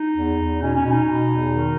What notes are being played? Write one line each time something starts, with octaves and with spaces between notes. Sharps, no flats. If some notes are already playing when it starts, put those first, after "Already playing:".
Already playing: D#4
E2
E2
B2 C#4
C#4
B2
D#4
B2
E2
D#3